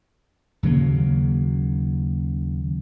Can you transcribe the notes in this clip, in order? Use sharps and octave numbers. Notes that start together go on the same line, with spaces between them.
D#2 C#3 F#3 A#3